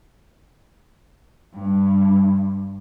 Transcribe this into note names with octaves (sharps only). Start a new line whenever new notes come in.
G2